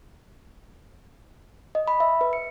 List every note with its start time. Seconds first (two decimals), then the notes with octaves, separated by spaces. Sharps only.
1.75 D#5
1.88 B5
2.00 E5
2.21 B4
2.33 C#7